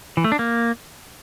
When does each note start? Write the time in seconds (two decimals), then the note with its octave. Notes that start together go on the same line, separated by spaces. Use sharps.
0.17 E3
0.24 A3
0.32 D4
0.39 A#3